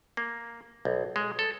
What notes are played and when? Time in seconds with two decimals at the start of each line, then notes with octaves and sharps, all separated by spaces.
0.17 A#3
0.85 B1
1.16 G#3
1.39 A4